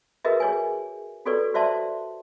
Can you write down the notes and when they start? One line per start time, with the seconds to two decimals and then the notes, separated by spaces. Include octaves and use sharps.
0.25 F#4 G#4 A#4 B4 D#5 E5
0.40 G#4 C#5 G#5
1.26 F#4 G4 A4 B4 C#5 D5
1.54 F#4 C5 D5 E5 A5 C6